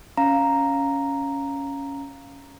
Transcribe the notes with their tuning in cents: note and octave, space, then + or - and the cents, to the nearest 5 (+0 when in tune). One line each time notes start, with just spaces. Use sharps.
C#4 +0 F5 +0 A#5 +0